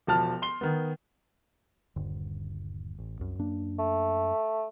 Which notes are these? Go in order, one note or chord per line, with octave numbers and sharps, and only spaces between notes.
E1 F3 A5 F6
C6 G7
D#3 B3
D#1 G2 D3
A1
C2 F#2
F#2 A#3 D4
A3